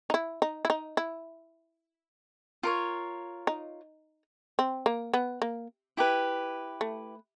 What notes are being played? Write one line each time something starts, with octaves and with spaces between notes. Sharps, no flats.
D#4
E4
D#4
E4
D#4
E4
F4 A#4 C#5
D#4
C4
A#3
B3
A#3
E4 G4 B4
A3